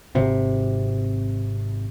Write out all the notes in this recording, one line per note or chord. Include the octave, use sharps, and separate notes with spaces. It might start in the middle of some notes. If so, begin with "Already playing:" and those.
G#1 C3